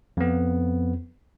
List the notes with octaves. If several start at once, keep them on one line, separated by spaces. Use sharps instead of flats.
F2 B3